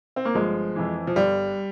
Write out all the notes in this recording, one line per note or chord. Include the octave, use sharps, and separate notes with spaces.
C4
A#3
G1 F3 G#3
F2 E3
F3
G1 G3